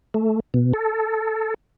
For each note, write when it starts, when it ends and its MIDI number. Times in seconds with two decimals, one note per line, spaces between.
0.14 0.40 57
0.54 0.73 47
0.73 1.54 69